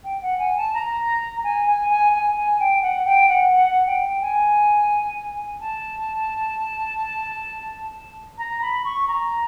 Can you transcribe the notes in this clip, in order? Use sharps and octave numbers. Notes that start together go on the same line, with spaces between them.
G5
F#5
G#5
A5
A#5
G#5
G#5
G#5
G#5
G#5
G5
F#5
G5
F#5
F#5
G5
G#5
A5
A#5
B5
C#6
A#5